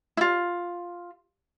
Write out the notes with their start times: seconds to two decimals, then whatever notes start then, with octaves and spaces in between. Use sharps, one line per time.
0.17 E4 F4